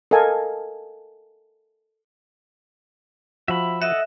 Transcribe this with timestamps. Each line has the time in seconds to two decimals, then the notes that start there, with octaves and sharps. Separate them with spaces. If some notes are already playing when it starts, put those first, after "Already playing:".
0.11 A4 A#4 D#5 F5 G#5
3.48 F3 F#4 E5 B5
3.82 A4 D#5 E5 F#5